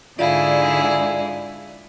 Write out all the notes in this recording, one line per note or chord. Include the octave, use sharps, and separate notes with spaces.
G#2 D3 E4 F4 G#4 D5 E5 F5